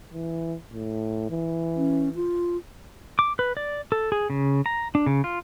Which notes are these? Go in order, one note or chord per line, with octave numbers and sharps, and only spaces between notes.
E3
A2
E3
C#4
F4
D6
B4
D5
A4
G#4
C#3
A#5
D4
C#3
F4